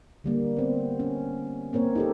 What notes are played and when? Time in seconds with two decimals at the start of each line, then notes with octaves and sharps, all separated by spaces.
0.24 D3 G3 A#3
0.57 B3 C4
1.00 C#4
1.73 A#3 C4 A#4 C#5
1.95 D#4 G4 A4